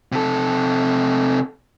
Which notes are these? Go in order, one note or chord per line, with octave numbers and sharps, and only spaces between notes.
C3 A4